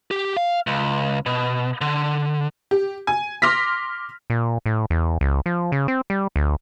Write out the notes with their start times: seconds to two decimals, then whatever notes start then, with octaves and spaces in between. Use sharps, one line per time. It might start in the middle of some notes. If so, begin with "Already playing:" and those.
0.11 G4
0.37 F5
0.67 C#2
1.26 B2
1.81 D3
2.71 G4
3.07 G#5
3.42 C6 D6 F6 A#6 B6
4.30 A#2
4.66 A2
4.90 E2
5.21 C#2
5.46 F3
5.72 C#3
5.88 C4
6.10 G3
6.36 D2